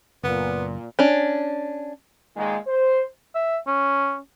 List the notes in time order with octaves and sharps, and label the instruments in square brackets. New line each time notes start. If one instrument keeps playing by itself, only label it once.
[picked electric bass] F#1 [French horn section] A#2 [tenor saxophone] B3
[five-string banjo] C#4 D4
[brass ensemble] A#2 D#3 G#3
C5
[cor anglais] E5
C#4